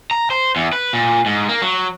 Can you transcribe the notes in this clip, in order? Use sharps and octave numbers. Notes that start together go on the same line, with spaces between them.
A#5
C5
E2
B4
A#2
G#2
A#3
F#3